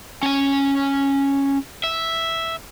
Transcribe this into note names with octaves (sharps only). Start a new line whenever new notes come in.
C#4 G#5
E5